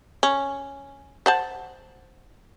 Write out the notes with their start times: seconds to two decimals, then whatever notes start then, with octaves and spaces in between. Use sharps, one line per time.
0.23 C#4
1.26 C5 F#5 A5